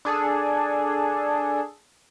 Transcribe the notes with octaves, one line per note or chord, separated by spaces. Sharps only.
D4 G#4 A4